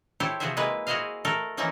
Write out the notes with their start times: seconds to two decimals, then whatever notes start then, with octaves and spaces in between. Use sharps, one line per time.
0.20 E4 G4 A4 C5 C#5
0.40 C3 F3 F#4 G#4 C5 E5
0.57 G#3 A#3 E4 B4
0.87 E4 F#4 G#4 C5 D#5 F5
1.25 A3 A4 A#4
1.57 E3 F3 A#3 C#4 D#4 E4